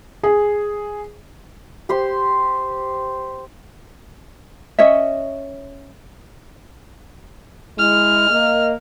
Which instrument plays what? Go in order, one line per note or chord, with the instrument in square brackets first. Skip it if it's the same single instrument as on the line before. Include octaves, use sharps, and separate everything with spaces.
[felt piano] G#4
[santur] G4 C5 C6
[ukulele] C#4 C#5 D#5 E5
[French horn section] G#3 E4 [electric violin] F6
[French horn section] A#3 D#5